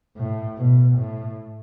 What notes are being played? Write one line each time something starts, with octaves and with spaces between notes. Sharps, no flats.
A2
B2
A2